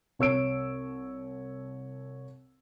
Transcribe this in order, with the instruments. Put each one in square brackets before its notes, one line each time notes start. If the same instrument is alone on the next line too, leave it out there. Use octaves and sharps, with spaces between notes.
[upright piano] C2 C#5 E6 D7